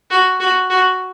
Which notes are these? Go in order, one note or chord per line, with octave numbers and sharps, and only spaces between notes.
F#4
F#4
F#4